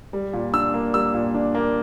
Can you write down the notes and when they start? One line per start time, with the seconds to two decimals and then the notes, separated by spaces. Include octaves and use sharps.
0.13 G3
0.33 A#2
0.53 D4 E6
0.74 A#3
0.94 G3 E6
1.14 A#2
1.34 D4
1.55 A#3